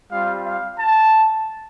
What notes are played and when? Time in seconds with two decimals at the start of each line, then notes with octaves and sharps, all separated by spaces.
0.11 G3 C4 F4 F5
0.46 F5
0.78 A5